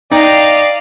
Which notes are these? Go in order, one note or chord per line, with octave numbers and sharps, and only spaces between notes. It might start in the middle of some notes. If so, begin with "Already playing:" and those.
D#4 D5 D#5 F5 G5